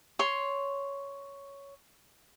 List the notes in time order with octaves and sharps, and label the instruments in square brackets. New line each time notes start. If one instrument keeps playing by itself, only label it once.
[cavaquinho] C#5 C6